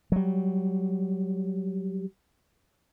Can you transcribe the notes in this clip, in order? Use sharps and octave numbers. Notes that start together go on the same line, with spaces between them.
F#3 G3